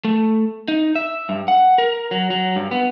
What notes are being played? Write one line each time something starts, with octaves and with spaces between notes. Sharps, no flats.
A3
D#4
E5
G2
F#5
A#4
F#3
F#3
G2
B3